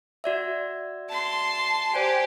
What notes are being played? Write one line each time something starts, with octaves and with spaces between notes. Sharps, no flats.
F#4 D5 E5
A5 C6
G4 C5 D5 G#5